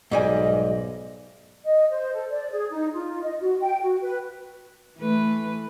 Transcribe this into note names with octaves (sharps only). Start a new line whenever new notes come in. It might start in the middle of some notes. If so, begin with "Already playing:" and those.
B1 G#2 G3 D#5 G#5
D#5
C5
A4
D5
G#4
D#4
F4
D#5
F#4
G5
F#4
B4
E3 A3 B4